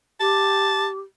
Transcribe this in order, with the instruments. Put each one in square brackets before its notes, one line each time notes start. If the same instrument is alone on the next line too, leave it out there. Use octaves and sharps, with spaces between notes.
[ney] G4 [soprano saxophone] A5